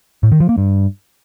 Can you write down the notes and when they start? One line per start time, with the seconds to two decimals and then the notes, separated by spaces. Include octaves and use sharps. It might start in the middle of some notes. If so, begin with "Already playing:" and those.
0.23 A2
0.32 D#3
0.40 F3
0.49 A#3
0.58 G2